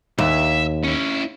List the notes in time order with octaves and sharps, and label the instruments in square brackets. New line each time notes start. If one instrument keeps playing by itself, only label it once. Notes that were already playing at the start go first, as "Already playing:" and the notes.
[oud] D#2 [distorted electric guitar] E5
[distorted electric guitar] C#4 E4